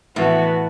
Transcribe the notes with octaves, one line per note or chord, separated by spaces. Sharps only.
A2 E3 B3 F#4